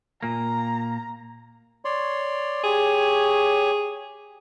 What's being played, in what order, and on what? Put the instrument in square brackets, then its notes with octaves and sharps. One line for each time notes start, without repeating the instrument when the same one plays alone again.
[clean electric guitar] A#2 A#3 [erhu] A#5
[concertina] C#5 D5 C6
[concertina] G4 C#5 [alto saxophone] G#4